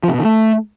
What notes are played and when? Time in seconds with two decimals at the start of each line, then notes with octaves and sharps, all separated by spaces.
0.03 F3
0.09 C3
0.14 B2
0.19 D#3
0.25 A3